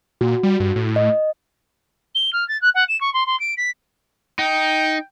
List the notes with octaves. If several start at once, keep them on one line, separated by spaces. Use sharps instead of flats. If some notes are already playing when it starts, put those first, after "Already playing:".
A#2 F#4
G3
G2
A2
D#5
G7
F6
A6
F#6
F#5
E7
C#6
C6
C6
D7
B6
D#4 G5